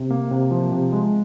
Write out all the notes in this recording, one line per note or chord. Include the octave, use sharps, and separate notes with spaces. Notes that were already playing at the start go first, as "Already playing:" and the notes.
Already playing: C3
A#3
C3
F3
C3
G#3